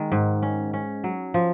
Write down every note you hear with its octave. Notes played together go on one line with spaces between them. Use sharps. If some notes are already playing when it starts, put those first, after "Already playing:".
Already playing: D#3 G#3
G#2
C#4
C#4
F#3
F3